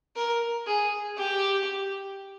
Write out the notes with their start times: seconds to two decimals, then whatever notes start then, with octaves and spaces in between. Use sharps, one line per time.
0.16 A#4
0.66 G#4
1.18 G4